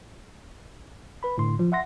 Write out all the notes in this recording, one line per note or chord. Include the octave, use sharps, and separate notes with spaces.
B4 B5
A2 D3 C6
F3
E5 F#5 C6 A#6